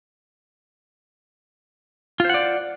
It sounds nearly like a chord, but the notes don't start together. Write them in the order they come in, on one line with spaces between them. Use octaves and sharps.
F4 C5 F#5 D5